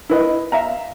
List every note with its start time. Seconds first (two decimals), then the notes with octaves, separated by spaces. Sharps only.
0.09 E4 B4 D#5
0.52 E5 F5 A#5